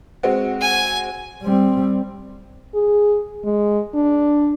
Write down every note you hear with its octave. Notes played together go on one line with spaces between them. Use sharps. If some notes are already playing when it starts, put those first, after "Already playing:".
G#3 C4 F#4
G#5
G3 C4
G#4
G#3
D4